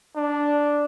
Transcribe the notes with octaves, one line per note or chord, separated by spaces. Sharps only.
D4